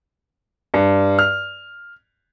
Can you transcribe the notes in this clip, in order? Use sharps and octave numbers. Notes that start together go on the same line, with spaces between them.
G2
F6